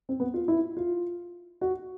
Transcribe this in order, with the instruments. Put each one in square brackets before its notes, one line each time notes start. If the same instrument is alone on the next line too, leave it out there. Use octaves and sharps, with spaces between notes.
[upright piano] C4
B3
F4
E4
F4
F#4